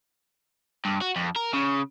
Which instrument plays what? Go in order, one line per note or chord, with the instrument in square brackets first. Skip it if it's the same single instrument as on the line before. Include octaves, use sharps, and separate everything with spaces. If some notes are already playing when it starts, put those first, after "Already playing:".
[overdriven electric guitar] G2
F#4
F2
A#4
C#3